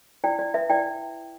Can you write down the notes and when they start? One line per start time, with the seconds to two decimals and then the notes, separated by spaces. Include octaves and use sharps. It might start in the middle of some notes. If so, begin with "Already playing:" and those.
0.24 E4 D5 G5
0.39 E4 D5
0.54 B4 E5
0.70 E4 D5 G5